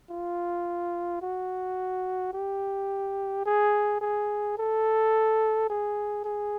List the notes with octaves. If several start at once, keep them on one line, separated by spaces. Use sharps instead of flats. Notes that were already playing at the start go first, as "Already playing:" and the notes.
F4
F#4
G4
G#4
G#4
A4
G#4
G#4